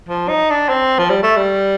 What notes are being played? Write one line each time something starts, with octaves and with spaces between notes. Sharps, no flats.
F3
D#4
D4
C4
F3
G3
A3
G3